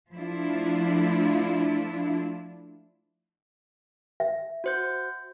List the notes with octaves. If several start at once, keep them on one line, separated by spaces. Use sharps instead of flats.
F3 A3 D4 E4 F4
E5
F#4 C5 G6